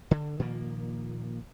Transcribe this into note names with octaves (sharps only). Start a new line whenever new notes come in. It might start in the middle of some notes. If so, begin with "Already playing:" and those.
D3
A#2 D#3 F3 A#3